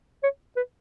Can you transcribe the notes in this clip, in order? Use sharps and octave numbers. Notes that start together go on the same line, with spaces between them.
C#5
B4